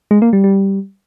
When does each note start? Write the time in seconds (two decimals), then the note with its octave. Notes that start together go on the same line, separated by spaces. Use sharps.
0.11 G#3
0.22 A#3
0.33 G3
0.44 G3